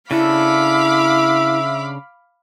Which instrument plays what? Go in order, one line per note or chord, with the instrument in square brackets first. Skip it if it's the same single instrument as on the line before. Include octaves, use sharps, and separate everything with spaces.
[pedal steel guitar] C#3 D4 A4 [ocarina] E4 [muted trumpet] E5 [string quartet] F5 B5 D6